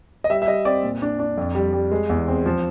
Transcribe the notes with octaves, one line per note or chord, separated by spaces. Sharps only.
D#5
G3 E5
E5
G3 D#5
C4 D5
A#2
D4
D4
F2
G3
G3
G#3
E2
C4
F3